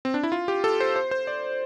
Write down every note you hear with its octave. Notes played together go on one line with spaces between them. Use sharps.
C4
D4
E4
F4
G4
A4
C5
C5
C5
D5